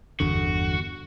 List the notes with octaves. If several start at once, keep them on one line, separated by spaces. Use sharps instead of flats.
G1 E2 D3 F#4